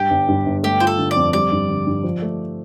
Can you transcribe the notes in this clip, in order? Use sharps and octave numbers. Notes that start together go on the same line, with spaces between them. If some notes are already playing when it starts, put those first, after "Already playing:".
Already playing: G2 G3 G4
G1
G2
G1
A3 G4
F4 C5
A4
D3
D5
F2
G3 D5
G2
D3
G2
F3
A3